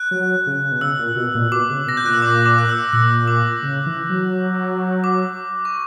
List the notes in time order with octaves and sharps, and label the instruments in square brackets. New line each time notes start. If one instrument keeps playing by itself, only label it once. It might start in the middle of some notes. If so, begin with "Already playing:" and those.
Already playing: [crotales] F#6
[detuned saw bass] F#3
C#3
B2
[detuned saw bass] C#3 [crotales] E6
[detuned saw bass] A#2
B2
A#2
[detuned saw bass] B2 [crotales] D6
[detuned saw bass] C#3
[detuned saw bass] B2 [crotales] A#6
[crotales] G6
[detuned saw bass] A#2 [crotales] F#6
[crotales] E6
D6
D6
F#6
E6
[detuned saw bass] A#2 [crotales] E6
[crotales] D6
[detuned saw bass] C#3
E3
F#3
[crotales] D6
C#6